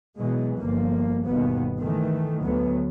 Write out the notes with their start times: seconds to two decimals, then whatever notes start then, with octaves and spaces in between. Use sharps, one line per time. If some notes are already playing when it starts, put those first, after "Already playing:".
0.18 B2 E3 F#3 G#3
0.60 G1 F3 A#3
1.27 G1 D#2 B2 B3
1.80 D#3 E3 A3
2.43 D2 F#3 B3